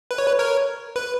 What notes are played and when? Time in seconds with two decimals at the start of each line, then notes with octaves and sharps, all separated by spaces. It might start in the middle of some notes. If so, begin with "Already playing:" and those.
0.11 B4
0.18 C#5
0.27 B4
0.39 A#4 C#5
0.96 B4